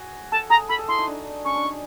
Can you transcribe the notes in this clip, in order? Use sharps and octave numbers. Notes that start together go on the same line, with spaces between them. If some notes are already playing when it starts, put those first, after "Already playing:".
Already playing: F#4 G#4
A4 A5
G#4 A#5
A4 B5
G#4
E4 C6
D#4
D4
C#4 C#6
D4
D#4